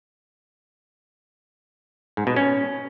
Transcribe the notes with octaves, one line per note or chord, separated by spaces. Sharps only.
G#2
B2
C#4